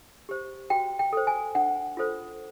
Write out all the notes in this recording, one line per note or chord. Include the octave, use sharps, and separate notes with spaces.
G4 C5
F#4 G5
G5
A4 C5
G#5
D4 F#5
F4 A4 C5